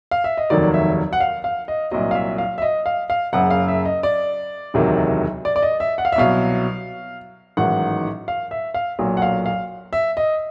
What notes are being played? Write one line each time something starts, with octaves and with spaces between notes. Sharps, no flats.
F5
E5
D#5
F1 D#2 D#3 F#3 D5
E5
F#5
F5
F5
D#5
C2 A#2 F#3 D#5
F5
E5
F5
E5
D#5
F5
F5
F#1 F#2 C#3 F#5
F5
E5
D#5
D5
E1 D2 C3 D#3 F#3
D5
D5
D#5
E5
F#5
F5
E5
C2 B2 F#3 F5
A1 G#2 D#3 F#3 F#5
F5
E5
F5
B1 A#2 F#3
F#5
F5
F5
E5
D#5